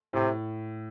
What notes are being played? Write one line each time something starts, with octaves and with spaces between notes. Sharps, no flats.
A2 C3